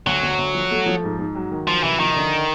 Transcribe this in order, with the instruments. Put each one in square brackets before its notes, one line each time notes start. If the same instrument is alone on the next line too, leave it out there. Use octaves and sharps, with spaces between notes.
[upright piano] D2 [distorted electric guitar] F#3
[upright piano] D2
D2
F3
A3
F3
G#2
G#2
F#3
D#3
[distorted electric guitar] F3 [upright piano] F#3
[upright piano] C2 [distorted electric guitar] E3
[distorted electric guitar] D#3 [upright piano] F3
[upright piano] D3